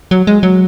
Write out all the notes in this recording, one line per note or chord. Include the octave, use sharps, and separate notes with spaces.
F#3
G#3
F#3